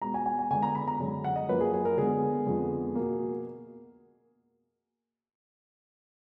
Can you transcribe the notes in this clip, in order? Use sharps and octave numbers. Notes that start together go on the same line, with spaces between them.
B2 G#3 B3 A#5
G#5
G#5
G#5
D3 G#3 B3 G#5
A#5
B5
A#5
F#2 D3 G#3
F#5
D#5
F#2 F3 A#3 B4
G#4
G#4
A#4
D3 G#3 B3 G#4
F2 D3 G#3 B3
B2 A#3